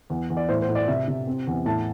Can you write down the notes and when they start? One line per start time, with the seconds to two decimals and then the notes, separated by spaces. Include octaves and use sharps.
0.10 E2
0.30 E2
0.37 D5
0.49 A2 C5
0.62 C5
0.68 A2
0.75 D5
0.88 C3 E5
1.08 C3
1.27 C4
1.47 E2
1.65 A2 A5